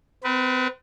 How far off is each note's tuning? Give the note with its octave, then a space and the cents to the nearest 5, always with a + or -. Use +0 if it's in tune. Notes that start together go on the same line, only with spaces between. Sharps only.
C4 -40 B4 -15